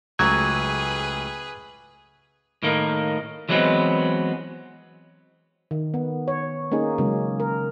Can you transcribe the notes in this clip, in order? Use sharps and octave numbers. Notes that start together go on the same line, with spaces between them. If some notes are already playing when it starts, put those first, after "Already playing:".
C#2 F#3 A3 G#4 B4 D6 G#6
A2 D#3 A#3
E3 F#3 G#3 B3 C4
D#3
B3
C#5
A#3 C#4 D#4 G#4
C#3 F#3 G#3 A#3 C#4
A#4